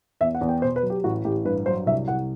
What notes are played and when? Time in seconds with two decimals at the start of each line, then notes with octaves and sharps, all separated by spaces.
0.21 E2 E5
0.35 F#5
0.41 E2
0.49 G5
0.62 B2 C5
0.76 B4
0.83 F#3
0.90 G4
1.04 A1 F#4
1.24 A1 G4
1.45 G2 B4
1.66 F#3 C5
1.86 C2 E5
2.08 C2 F#5